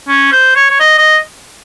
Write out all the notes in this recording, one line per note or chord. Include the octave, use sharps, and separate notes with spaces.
C#4
C5
C#5
C#5
D#5
D#5